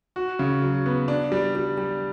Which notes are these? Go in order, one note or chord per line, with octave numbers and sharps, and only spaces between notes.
F#4
C#3
F#3
B3
D4
G3
G3
G3